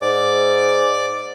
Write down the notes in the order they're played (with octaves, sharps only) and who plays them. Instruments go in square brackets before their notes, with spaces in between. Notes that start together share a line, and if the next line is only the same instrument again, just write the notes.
[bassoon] G#2 [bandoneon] D5 D6